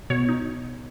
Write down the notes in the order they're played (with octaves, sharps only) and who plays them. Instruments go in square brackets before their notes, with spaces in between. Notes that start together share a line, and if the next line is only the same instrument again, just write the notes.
[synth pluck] B2 C#5
D#4